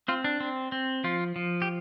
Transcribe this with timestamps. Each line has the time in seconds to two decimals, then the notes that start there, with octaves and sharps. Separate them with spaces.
0.08 C4 F4
0.24 D4
0.40 C4
0.72 C4
1.04 F3 F4
1.36 F3
1.62 G4